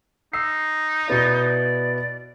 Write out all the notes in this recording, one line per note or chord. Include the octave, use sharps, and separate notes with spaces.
D#4 E6 C7
B2 B3 E4 D5
D5